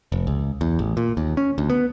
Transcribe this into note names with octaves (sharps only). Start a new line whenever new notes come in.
F1
C#2
E2
A1
A#2
D#2
C#4
D2
B3